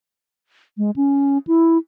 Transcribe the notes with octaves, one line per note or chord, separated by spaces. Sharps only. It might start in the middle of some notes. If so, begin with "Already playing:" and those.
G#3
C#4
E4